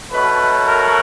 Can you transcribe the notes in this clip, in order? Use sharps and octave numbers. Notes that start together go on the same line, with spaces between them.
B2 F#3 A3 B4
A#4